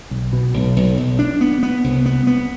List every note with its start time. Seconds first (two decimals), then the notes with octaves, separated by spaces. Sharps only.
0.11 B1
0.33 B2
0.54 B1
0.76 B1
0.98 B1
1.19 D4
1.41 B3
1.63 B3
1.84 C2
2.06 B3
2.27 B3